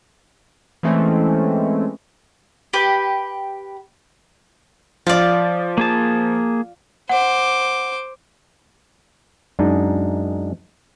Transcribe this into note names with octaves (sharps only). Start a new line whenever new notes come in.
E3 G#3 A3 C4 C#4
G4 B4
F3 F4 D5
A#3 G#4 A5
C5 F#5 D6
F#2 G#3 D4 D#4